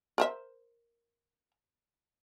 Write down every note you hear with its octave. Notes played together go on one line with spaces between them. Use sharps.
A#4 C5 E5